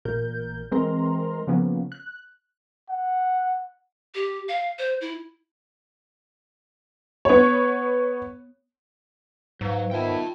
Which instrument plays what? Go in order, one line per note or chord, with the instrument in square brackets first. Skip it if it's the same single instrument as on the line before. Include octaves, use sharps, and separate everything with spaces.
[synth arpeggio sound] A1 A#2 A#4 G6
E3 G#3 C4 A#4 A#5 C6
C#3 F3 A#3 B3 C#4
F#6
[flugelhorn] F#5
[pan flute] G4
F5
C5
E4
[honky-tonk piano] B3 C#5
[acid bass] G#2 [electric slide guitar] F#3 [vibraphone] B4 F5
[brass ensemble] D#3 B3 E4 [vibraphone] F4 [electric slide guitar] G5 A5